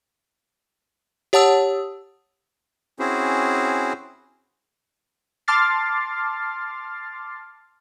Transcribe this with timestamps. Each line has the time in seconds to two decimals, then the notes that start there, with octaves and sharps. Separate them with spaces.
1.33 G4 C#5 F#5 A5 D#6 E6
2.99 C4 C#4 E4 F#4 G#4 C5
5.48 A5 C6 D6 F6 A6 C7